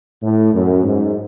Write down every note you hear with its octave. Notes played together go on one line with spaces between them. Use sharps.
A2
F#2
G#2